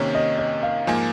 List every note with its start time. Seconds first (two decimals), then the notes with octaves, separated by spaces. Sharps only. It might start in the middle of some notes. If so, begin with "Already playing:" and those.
Already playing: C3 D#3 A#3 C#4 C#5
0.15 D#5
0.39 D#5
0.63 F5
0.87 G#2 F3 A#3 G#5